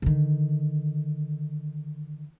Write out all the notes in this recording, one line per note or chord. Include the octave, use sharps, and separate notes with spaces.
D3 D#3